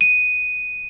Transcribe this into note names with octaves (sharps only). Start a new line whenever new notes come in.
D#7